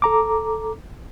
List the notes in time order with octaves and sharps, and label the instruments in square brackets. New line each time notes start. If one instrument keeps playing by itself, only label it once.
[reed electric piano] A4 A#5 D6